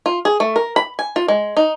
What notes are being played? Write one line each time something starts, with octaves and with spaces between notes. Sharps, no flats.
F4
G#4
A3
A#4
B5
G#5
F4
G#3
D#4